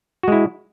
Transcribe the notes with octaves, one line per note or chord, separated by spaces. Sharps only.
G#3 E4 F#4